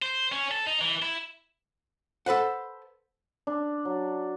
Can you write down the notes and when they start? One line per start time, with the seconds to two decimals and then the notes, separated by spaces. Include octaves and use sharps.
0.02 C5
0.32 C#4
0.51 A4
0.66 D#4
0.81 E3
1.02 E4
2.26 A4 B4 C5 F#5
3.47 D4
3.85 F#3